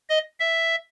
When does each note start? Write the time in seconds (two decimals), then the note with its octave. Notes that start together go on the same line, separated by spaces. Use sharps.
0.10 D#5
0.40 E5